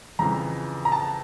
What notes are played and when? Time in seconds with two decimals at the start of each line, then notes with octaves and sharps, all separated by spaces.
0.19 F2 C#3 E3 A#5
0.85 A#5
0.92 A5